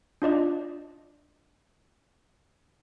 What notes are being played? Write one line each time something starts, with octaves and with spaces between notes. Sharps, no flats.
D4 F4 D5 D#5